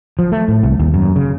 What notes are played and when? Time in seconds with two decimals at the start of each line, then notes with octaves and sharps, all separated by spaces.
0.19 F3
0.32 A3
0.48 A2
0.63 C2
0.80 D#2
0.94 F#2
1.16 C#3